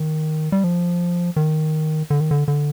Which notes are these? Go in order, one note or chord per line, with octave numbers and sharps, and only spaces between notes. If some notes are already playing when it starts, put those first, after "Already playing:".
Already playing: D#3
G3
F3
D#3
D3
D#3
D3
D3